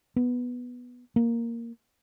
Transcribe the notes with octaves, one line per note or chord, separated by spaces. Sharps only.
B3
A#3